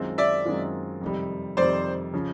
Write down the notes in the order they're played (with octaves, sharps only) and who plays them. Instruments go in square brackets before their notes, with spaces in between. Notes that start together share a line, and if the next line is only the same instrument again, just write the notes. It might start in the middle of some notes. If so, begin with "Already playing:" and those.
Already playing: [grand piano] F#2 D#3 G#3 C4 F4
[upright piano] D5 E5
[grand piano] F#2 D#3 G#3 C4 F4
F2 C3 D#3 G3
[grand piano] F2 C3 D#3 G3 [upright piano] C5 D5
[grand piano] C#3 F3